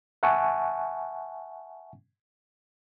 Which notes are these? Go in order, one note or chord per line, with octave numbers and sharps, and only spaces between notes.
E5 F#5 G#5 A5 C#6